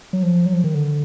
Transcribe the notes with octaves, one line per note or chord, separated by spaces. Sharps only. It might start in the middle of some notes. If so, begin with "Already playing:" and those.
F#3
F3
F#3
F3
D#3
D3